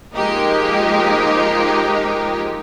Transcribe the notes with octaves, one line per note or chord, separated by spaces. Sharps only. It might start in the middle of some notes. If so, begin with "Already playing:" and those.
F3 G#3 A#3 D#4 G4 A#4